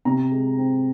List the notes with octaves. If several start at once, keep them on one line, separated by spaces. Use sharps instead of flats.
C3 A#5
G#3
C4